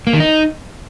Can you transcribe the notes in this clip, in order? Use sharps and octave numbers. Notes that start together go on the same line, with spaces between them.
A#3
D#3
D#4